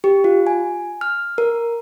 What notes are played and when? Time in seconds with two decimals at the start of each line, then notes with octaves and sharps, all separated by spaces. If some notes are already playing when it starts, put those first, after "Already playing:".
0.04 G4
0.24 F4
0.47 G#5
1.01 F6
1.38 A#4